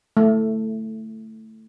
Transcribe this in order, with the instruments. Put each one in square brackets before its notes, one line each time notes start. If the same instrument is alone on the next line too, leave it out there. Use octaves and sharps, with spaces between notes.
[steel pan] A3